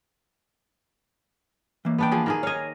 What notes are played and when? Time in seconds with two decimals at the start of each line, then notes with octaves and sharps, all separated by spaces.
1.85 E3 A#3
1.98 B3 D4 G5
2.12 F3 G#4
2.26 D#3 A#3 G#4
2.43 C#5 D#5 F5 G#5